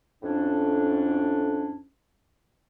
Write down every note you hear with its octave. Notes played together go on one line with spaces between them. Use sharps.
F2 A2 C#4 D4